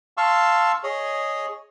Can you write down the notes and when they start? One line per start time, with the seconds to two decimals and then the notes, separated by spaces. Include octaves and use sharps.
0.17 F5 A5 C6 C#6 E6
0.83 G#4 C#5 D#5